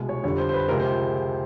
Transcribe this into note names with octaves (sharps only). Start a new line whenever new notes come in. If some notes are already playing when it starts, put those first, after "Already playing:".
Already playing: C2 B2 G#3
C#5
F2 D3 G3 C#5
C5
C5
B4
C#2 C3 F3 G#3 A#4
C5